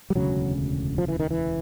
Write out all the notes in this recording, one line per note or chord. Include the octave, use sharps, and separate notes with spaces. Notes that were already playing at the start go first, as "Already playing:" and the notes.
G3
E1 D2 C#3 F#3
F3
E3
D#3
E3